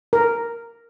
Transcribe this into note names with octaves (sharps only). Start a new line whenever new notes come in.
A#4